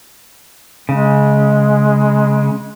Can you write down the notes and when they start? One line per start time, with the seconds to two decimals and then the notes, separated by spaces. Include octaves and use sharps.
0.89 C#3 G#3